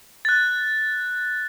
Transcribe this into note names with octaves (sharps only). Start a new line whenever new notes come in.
F#6 A6